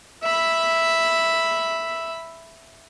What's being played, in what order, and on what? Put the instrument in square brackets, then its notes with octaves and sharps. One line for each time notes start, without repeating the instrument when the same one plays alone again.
[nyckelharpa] E5 B5